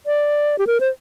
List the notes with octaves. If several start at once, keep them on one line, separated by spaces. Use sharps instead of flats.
D5
G4
A#4
C5